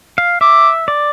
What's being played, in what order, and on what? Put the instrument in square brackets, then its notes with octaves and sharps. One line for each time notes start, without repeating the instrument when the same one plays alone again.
[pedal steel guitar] F5
[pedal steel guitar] E5 [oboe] D6
[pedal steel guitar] D5